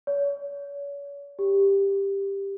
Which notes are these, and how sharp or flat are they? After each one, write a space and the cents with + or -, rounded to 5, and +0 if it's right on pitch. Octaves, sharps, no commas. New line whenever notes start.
C#5 +40
G4 +10